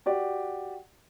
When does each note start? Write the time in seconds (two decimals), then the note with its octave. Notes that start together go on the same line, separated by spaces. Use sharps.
0.06 F#4 G4 D5